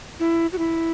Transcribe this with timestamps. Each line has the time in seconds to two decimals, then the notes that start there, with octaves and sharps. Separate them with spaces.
0.20 E4
0.53 F#4
0.58 E4